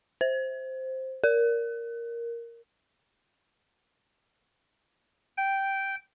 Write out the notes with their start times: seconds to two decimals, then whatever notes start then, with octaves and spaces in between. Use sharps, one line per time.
0.21 C5
1.24 A#4
5.37 G5